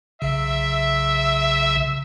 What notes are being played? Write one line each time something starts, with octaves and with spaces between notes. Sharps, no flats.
B1 C#3 E5